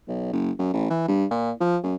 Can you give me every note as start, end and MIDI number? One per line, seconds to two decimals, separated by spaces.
0.08 0.32 35
0.33 0.51 30
0.59 0.72 42
0.73 0.90 33
0.90 1.07 52
1.08 1.25 43
1.31 1.51 46
1.60 1.78 53
1.83 1.95 42